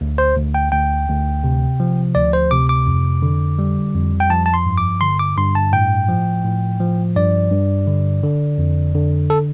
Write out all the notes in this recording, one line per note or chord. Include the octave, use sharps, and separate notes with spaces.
D2
C5
D2
G5
D2 G5
D2
C3
F3
D2 D5
C5
C3 D6
D6
F2
D3
G3
F2
G5
F3 A5
A5
C6
G2
D6
D3 C6
D6
G2 C6
A5
A2 G5
F3
A2
F3
G2 D5
G2
D3
D3
F2
D3
A4